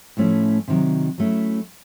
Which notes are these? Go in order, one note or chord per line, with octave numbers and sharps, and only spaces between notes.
A2 F3 A3 C#4 E4
C3 D#3 F#3
F#3 A3 C#4 E4